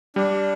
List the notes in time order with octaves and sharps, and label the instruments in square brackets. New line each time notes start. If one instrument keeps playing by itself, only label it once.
[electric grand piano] G3 [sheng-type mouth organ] D4